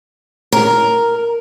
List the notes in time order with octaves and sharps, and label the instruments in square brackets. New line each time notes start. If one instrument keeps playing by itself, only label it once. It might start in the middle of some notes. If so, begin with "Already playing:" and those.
[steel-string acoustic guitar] A#4